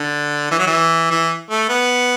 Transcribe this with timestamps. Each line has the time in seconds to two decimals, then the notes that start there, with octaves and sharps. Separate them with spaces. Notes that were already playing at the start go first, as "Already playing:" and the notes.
Already playing: D3
0.51 E3
0.59 F#3
0.67 E3
1.11 E3
1.50 A3
1.69 B3